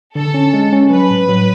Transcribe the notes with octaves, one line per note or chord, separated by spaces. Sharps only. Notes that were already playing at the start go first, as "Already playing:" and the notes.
D3 A4
C#4
G#3
C#4
F#3 B4
A2
F#3